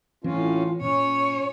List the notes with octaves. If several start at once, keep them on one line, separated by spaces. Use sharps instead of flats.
A2 E3 C4 C#4 F4
A#2 C#4 C#5